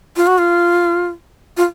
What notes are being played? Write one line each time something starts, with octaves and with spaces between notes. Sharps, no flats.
F4
F#4
F4
F4